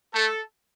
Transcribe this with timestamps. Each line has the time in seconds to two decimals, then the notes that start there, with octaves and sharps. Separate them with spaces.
0.14 A3 A4